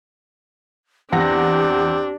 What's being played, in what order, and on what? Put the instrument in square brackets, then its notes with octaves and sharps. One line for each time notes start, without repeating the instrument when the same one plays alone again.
[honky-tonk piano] E2 F#5 A#6 [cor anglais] C4 [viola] D4 [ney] G4